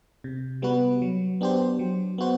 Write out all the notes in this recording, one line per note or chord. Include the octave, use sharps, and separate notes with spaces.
C3
G3 B3 F#4 B4
F#3
B3 D4 G4 C5
F#3
B3 F#4 C5